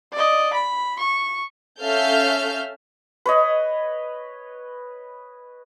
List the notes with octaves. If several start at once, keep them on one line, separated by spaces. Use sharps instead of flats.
D5 D#5
B5
C#6
C#4 A4 E5 F5 F6 G6
B4 C#5 D#5